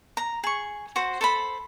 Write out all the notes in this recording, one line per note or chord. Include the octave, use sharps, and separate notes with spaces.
A#5
G#4 C#6
F#4 C5
A4 C5 B5